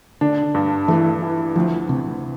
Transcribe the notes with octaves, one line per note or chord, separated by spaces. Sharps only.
D3 D4
G2
E3 A3
E3
D2 F3
D2 C3